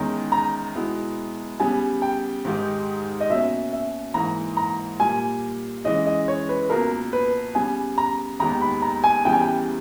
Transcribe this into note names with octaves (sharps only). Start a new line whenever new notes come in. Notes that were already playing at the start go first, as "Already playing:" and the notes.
Already playing: E2 D#3 G#3 C#4 A#5
A#5
B2 G#3 B3 E4
C#3 G3 B3 G#5
G5
G#2 D#3 G#3 D#4 G4
D#5
B2 A#3 C#4 E5
E5
G#2 E3 A#3 A#5
A#5
A#2 G3 A#3 G#5
C#3 E3 G#3 C#4 D#5
D#5
C#5
B4
C#2 B2 A#3 A#4
B4
C#3 G3 B3 G#5
A#5
D#2 D#3 G#3 B3 G4 A#5
B5
A#5
G#5
E2 C#3 E3 G3 B3 G5
G#5
G5